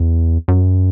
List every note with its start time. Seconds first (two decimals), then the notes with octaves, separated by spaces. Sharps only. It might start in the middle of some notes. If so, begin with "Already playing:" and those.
Already playing: E2
0.48 F#2